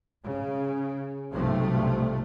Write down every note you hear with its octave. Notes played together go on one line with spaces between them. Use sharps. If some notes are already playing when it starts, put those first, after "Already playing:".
C#3
B1 G2 C3 F3 A3